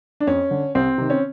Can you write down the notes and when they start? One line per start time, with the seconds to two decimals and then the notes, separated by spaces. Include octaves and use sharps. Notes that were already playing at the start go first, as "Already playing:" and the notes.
0.20 D4
0.27 F2 C#4
0.51 D3
0.75 C2 C4
0.98 C3 D#3
1.10 C#4